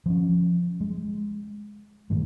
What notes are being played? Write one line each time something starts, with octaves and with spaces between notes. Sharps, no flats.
F3 C4 C#4
G#3
A2 D#3 G#3